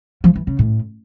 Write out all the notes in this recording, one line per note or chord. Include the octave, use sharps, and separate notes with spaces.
F3
E3
C#3
A2